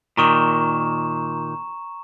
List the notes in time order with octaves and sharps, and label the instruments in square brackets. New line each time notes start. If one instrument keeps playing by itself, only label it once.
[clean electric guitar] A#2 D#3 [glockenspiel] A#5 C#6 E7